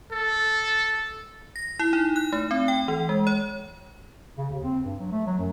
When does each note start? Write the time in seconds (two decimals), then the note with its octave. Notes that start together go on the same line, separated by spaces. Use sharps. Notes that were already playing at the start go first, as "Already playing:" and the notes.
0.12 A4
1.56 A#6
1.79 E4
1.93 D#4
2.16 F#6
2.32 A3
2.51 C4
2.68 G5
2.88 E3
3.09 G#3
3.27 C#5
4.38 C#3
4.50 D#2
4.64 C4
4.85 G2
5.00 F#3
5.12 A3
5.27 F#3
5.39 F#2